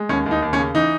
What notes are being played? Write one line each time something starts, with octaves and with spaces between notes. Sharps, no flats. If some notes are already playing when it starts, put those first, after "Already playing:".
Already playing: G#3
D#2 C#4
D#2
D#4
D#2
C#4
C#3
E3 D#4